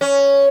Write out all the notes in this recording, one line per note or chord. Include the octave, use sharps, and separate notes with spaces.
C#4